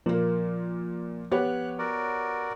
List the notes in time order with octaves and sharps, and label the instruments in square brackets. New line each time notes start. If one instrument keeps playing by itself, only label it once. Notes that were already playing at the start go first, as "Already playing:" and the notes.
[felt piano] A#2 A#3 [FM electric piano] F3
[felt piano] B3 G4 C#5 [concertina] F#6
[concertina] F#4 A#4 D5